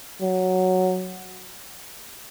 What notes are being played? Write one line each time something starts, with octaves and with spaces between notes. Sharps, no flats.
F#3